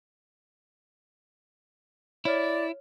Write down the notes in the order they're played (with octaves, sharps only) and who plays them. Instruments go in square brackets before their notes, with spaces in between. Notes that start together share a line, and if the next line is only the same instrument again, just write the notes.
[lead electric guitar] E4 [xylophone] C#5 F6 [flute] D5